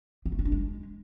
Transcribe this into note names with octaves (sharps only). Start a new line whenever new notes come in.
B3
A3
C#4
D4
G#3